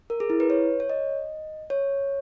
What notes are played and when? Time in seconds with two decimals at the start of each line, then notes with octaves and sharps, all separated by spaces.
0.10 A#4
0.20 G#4
0.30 E4
0.40 B4
0.50 C#5
0.80 C#5
0.90 D#5
1.70 C#5